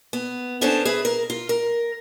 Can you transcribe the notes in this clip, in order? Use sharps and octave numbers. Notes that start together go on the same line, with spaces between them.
B3
B3 C#4 D4 A4 C5 A5
G#4 B4 E5
A#4
F4
A#4